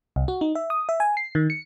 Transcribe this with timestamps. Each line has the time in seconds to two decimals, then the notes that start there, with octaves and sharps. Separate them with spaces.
0.16 C2
0.28 F#4
0.41 D#4
0.55 E5
0.70 D#6
0.89 E5
1.00 G#5
1.17 C7
1.35 D#3
1.50 C#7